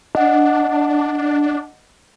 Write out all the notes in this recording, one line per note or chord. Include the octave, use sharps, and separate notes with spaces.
D4 D#5 F#5